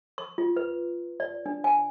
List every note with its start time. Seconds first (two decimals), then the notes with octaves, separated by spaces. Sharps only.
0.18 C#6
0.38 F4
0.56 B4
1.20 D5
1.46 D4
1.64 G#5